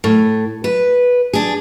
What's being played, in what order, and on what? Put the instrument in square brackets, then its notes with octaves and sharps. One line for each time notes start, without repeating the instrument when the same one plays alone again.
[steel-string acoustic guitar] A2
B4
D4 G#4